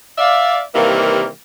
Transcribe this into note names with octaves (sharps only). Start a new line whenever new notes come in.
D5 E5 F5
C3 D#3 E3 G3 A#3